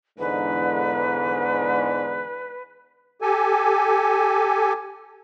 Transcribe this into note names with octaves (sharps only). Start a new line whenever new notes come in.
E2 G#2 D3 B4
G4 A4 G#5